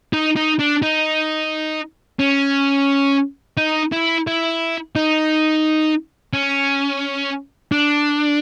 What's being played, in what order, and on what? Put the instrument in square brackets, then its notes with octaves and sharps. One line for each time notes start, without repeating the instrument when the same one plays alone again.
[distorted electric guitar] D#4
D#4
D4
D#4
C#4
D#4
E4
E4
D#4
C#4
D4